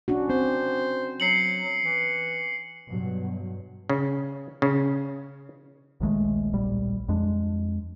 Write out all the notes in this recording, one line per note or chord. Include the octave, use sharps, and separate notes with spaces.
C#4 D4 F#4
C4 C5
F#3 C7 C#7 F#7
E3
G2 B2 F#3
C#3
C#3
A#1 D#2 G#3 A3
D1 A#1 G3
F2 G#3 D4